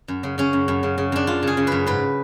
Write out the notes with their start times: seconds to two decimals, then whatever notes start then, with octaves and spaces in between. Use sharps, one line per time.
0.08 F#2
0.23 C#3
0.38 C#3 C#4
0.53 F#2
0.68 F#2
0.83 C#3
0.98 C#3
1.12 F#2 D4
1.27 F#2 F4
1.43 C#3 G#4
1.57 C#3
1.67 F#2 B4
1.86 G#2 B4